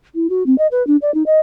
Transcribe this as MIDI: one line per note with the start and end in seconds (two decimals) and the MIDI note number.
0.15 0.27 64
0.30 0.46 66
0.46 0.58 60
0.58 0.67 75
0.71 0.85 71
0.87 0.97 62
1.02 1.13 74
1.14 1.23 63
1.26 1.40 75